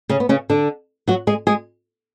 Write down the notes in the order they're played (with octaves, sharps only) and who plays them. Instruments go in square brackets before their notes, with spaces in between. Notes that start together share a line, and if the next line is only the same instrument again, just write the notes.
[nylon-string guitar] C#3 C#4
B3
C#3 C#4
D3 D4
F#3 F#4
G#3 G#4
G#3 G#4